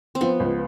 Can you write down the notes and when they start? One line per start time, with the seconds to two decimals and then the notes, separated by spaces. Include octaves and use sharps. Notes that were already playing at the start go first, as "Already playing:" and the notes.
0.15 C4
0.21 F3 B3
0.40 C#2